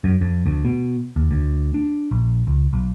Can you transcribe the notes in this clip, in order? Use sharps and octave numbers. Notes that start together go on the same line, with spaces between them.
F#2
F2
D2
B2
D#2
D2
D4
A#1
C#2
B1